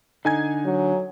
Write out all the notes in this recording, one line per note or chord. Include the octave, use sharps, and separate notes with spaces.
D3 D#4 G#5 G#6
F#3